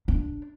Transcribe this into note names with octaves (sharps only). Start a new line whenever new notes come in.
D4